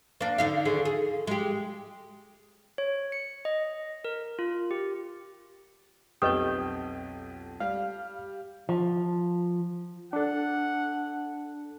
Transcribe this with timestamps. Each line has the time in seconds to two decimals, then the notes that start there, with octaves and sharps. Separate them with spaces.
0.21 A#3 D4
0.38 D3 D#4 F5
0.65 D#2 D3 G#4
0.85 G#4
1.27 G#3 G4
2.78 C#5
3.12 C#7
3.45 D#5
4.05 A#4
4.39 F4
4.71 G4
6.22 B1 F2 G4 B4 D#5 G5 D#6 G6
7.60 G3 F5
8.69 F3
10.13 D4 A4 F#5